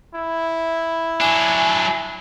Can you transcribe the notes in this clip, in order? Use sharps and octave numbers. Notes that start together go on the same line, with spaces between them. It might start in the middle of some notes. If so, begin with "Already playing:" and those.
E4
F#3 D4 G#5